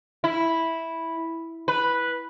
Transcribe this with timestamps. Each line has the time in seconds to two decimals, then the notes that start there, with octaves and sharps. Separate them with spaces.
0.24 E4
1.68 B4